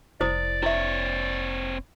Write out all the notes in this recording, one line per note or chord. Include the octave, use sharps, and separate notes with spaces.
F1 E4 C5 D5 D#6
C4 E4 C#5 E5